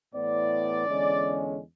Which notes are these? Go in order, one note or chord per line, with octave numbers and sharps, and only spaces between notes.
A2 E3 B3 D5
E2 D3 G#3 C#4